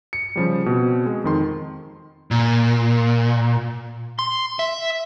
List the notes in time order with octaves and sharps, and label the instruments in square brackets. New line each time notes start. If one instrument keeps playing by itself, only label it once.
[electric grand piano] C#7
C#3 F3 G3
B2 C4
G#3
F2 D#3 C6
[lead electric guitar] A#2
C6
E5